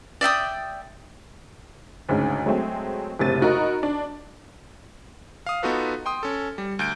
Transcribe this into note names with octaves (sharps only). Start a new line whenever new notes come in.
D5 E5 G5 D#6
D2 G#2 C#3
F#3 G#3 A3 C4
F#1 A2 C3 A6 D#7
D#4 F#4 A#4 D#5 A#5 B5
D4
F5 D#6
B3 D#4 F4 F#4 A4 B4
G5 C6 D#6
C#4 A4
G3
D2 G6 D7